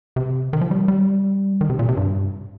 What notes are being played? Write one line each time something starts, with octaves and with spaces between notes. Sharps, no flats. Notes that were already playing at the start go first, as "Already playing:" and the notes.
C3
D#3
F3
G3
G3
D#3
C3
A#2
C3
G2